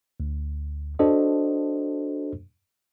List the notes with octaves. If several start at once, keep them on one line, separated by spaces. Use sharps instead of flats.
D2
D4 F#4 A4 C5 D#5